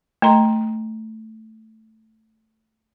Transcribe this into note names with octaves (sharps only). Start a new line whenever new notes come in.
A3 D#5 G5 A#5 C6